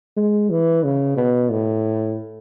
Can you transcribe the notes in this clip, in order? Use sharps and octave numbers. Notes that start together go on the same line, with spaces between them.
G#3
E3
C#3
B2
A2